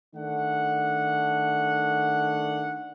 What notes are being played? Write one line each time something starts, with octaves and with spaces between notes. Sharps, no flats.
D#3 A3 D4 F#5